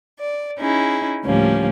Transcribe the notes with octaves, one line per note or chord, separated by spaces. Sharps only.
D5
C#4 D#4 E4 G#4
D2 A2 F3 G3 A#3 C#4